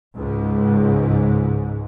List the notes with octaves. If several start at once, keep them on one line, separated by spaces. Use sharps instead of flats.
C#2 G#2